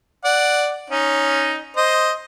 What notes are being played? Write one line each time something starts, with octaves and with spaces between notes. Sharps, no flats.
D5 F#5
C#4 D#4
C5 D#5